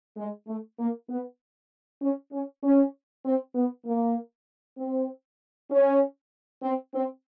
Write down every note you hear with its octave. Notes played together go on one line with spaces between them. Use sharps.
G#3
A3
A#3
B3
C#4
C#4
C#4
C4
B3
A#3
C4
C#4
C4
C4